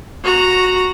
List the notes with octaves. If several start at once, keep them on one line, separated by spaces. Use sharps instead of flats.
F#4 A#5